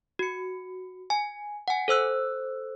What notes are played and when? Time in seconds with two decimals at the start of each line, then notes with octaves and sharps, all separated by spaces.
0.19 F#4 C#7
1.10 G#5
1.68 F#5 G#5
1.88 A4 C5 E6 F#6